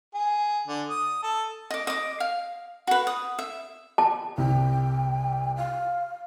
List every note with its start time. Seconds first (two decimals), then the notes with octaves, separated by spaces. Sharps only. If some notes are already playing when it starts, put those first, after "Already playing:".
0.14 G#4
0.67 D3
0.90 D#6
1.23 A4
1.71 D#5 D6
1.87 D#5 D6
2.20 F5
2.87 F#4 B4
3.07 D#6
3.39 E5
3.98 A5
4.38 C2 G5
5.56 F5